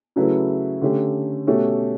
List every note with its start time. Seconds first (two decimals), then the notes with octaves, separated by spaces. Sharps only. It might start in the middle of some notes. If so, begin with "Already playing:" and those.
0.16 C#3 F#3 A3 E4 B4
0.82 D3 A3 C#4 G4
1.47 B2 A3 C#4 G4